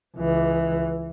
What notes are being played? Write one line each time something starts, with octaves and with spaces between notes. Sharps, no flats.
C#2 E3